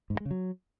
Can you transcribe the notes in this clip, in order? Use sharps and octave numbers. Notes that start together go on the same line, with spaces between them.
G#2
G2
G#3
C#3
F#3